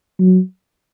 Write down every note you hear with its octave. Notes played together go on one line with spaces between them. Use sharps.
F#3